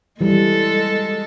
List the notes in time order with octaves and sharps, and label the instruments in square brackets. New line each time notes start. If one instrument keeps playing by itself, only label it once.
[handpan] E3 G3 [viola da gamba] G#3 A4